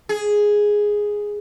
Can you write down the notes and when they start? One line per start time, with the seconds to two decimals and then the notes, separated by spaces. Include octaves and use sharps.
0.09 G#4